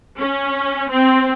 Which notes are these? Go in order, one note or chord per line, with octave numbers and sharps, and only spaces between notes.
C#4
C4